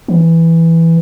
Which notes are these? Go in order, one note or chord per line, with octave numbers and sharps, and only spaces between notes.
E3